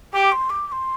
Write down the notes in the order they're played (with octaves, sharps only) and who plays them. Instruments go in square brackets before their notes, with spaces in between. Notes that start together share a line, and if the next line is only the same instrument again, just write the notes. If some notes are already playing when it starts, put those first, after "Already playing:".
[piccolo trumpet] G4 [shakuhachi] D6
[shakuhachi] C6
D6
D6
C6